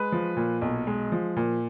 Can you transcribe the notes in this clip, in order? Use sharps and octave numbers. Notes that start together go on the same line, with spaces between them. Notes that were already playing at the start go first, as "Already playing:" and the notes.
Already playing: G#3 B4
F3
A#2
B1
G#3
F3
A#2